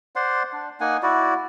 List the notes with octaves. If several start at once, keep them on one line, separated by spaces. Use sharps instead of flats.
C5 D5 F#5 C6
D4
A#3 D#4 F#5 G#5
E4 F#4 D5